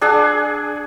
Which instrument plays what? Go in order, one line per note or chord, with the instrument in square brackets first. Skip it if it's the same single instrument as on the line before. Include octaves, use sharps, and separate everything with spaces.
[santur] D4 G#4 F#5